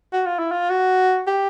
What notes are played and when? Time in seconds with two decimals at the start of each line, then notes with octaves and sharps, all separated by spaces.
0.13 F#4
0.26 F4
0.39 E4
0.51 F4
0.70 F#4
1.27 G4